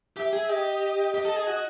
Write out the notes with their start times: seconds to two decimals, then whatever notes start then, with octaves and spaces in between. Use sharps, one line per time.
0.17 G4 E5
0.33 G#4
0.49 G4 D#5
1.14 G4 D#5
1.25 A4
1.36 G#4
1.47 F#4